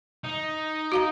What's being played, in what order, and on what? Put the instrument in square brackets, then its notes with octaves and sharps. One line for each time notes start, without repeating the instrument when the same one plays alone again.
[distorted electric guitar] D#4
[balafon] F#4 F5 A#5